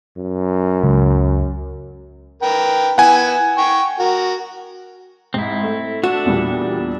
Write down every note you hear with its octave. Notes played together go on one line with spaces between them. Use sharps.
F#2
C#2
A#4 B4 G5
B3 E4 F#5 G#5
G5 C#6
F#4 A#4
G#2 C4 E4
A3
D4 F#4 A4 E5
E2 A#2 G3